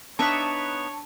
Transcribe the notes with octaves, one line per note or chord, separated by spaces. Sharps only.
B3 D4 D#4 B4 C#5 E5 A5 C#6